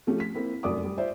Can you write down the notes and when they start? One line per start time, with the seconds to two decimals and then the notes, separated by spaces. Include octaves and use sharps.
0.07 F3 A3 C#4 G4
0.20 B6
0.35 A#3 C4 E4
0.63 F1 F#2 D5 D6 D#6
0.84 G3
0.98 F4 C5 D5 E5